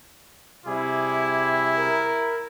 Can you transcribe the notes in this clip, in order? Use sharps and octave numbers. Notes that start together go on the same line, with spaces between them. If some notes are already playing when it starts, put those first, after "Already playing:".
C3 G3 E4 G#4 D6
A#4